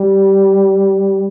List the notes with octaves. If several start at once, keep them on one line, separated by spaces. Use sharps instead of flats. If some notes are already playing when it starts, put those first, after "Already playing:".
Already playing: G3